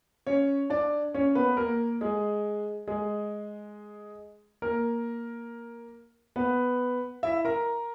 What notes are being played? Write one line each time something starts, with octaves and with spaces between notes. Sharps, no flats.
C#4 C#5
D4 D5
C#4 C#5
B3 B4
A#3 A#4
G#3 G#4
G#3 G#4
A#3 A#4
B3 B4
E4 E5
A#4 A#5